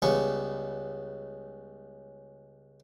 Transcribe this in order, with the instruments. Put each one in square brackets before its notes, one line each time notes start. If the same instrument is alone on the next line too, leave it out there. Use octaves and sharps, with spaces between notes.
[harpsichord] C#2 C#3 G3 B3 C#6